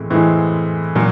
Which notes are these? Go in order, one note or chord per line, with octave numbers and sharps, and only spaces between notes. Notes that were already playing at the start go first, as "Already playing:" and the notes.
Already playing: A2 E3 G#3 C4
A2 E3 G#3 C4
A#2 F#3